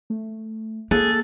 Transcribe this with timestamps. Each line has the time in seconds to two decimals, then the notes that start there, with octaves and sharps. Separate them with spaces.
0.10 A3
0.91 A#3 G#4 A4 F#6